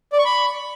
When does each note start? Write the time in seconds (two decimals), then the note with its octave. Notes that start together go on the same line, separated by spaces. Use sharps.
0.13 D5
0.19 C#6
0.25 B5